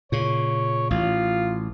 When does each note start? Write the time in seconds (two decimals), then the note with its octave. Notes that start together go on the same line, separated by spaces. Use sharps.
0.12 A#2 C#3 C#5
0.90 A1 F4